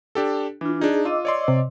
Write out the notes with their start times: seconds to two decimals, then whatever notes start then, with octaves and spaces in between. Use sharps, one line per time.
0.15 D4 G4 A4
0.61 E3 D4 F4
0.81 D4 D#4 G#4
1.05 F4 D#5 D6 E6
1.25 C#5 D5 C6
1.48 C3